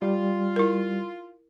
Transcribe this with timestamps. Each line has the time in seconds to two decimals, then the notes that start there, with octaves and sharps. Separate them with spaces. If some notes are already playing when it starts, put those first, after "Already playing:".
0.02 G3 F4
0.56 E4 A#4